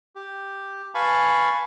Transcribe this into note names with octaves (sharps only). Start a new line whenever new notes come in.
G4
B4 F5 G#5 A5 B5 C#6